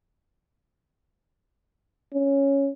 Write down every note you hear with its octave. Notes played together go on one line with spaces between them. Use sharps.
C#4